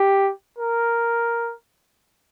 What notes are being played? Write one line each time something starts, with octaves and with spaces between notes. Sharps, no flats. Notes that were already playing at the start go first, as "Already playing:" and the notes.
Already playing: G4
A#4